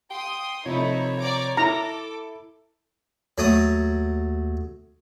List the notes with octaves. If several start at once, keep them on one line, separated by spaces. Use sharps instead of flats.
G5 C6 D#6
C3 F3 A3 D#4 E4 C#5
D5 A#5 D6
E4 A4 A#5 D6
D#2 F#3 A3 D#6